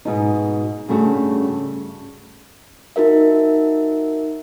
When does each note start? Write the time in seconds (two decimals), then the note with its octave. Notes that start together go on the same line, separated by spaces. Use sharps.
0.05 G#2 B2 D#4
0.89 G2 C#3 A3 F#4 A4
2.96 D#4 F#4 A#4 E5